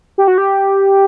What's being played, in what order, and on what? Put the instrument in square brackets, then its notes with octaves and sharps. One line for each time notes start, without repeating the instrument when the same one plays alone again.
[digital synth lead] G4
F#4
G4